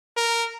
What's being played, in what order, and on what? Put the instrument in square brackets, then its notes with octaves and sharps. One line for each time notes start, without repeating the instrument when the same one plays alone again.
[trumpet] A#4